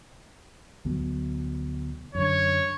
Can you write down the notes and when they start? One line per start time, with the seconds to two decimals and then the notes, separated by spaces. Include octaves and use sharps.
0.85 D2 B2 F#3
2.15 F#2 D3 C#5